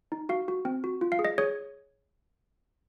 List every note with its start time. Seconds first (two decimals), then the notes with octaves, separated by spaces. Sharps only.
0.12 D#4
0.29 F#4 F5
0.48 F#4
0.65 C4
0.84 F#4
1.01 F4
1.12 F5
1.19 G#4
1.25 D#5
1.38 G#4 C#5